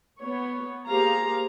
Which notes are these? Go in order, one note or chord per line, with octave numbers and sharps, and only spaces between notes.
B3 C#5
A#3 G4 G#4 C5 F5 A#5